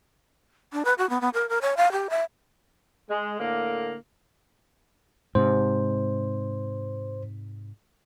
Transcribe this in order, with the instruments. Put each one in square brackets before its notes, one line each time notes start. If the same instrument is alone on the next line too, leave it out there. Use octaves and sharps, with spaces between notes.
[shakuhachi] D4
B4
F#4
B3
B3
A#4
A#4
C#5
F5
G4
E5
[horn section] G#3
A2 D3 A#3
[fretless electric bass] G#2 C3 [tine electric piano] C5